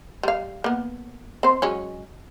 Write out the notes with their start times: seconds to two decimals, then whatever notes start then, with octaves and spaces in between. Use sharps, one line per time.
0.23 G3 F5
0.64 A#3 B3
1.43 C4 C5
1.62 F#3 G#3 C#4